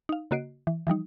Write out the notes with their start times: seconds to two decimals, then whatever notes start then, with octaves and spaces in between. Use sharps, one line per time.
0.09 D#4 F5
0.31 C#3 A#3 F#4 D#5 C7 D7
0.67 E3
0.87 E3 F3 G3 D#4